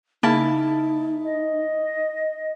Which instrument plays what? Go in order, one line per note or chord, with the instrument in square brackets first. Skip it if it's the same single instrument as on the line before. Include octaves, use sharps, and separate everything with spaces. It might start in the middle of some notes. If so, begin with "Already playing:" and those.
[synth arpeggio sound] C#3 A#3 [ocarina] D#4 [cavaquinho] E4 A5
[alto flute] D#5